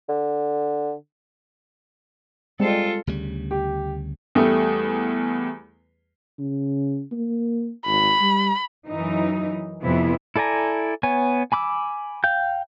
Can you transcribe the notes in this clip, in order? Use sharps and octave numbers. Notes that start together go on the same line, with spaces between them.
D3
G3 G#3 C4 F4 A4
D2 C#3 G3
G4
E2 G3 A3 D#6
C#3
A#3
G#1 B5
G3
F#2 E3 D#4
F2 C3 E3 B3 E4
E4 A4 D5 G#5 A#5
B3 C#5 G#5
G#5 B5 D6 E6
F5 G5 G6